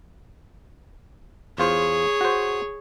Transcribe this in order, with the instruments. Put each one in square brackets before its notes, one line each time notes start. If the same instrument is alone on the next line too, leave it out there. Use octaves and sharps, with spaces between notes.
[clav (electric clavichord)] E2 F4 C5 [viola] G#4 C#5
[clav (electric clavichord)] F#4 C5